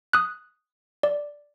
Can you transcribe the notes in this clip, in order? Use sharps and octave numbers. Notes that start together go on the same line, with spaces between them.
D#6 F#6
D5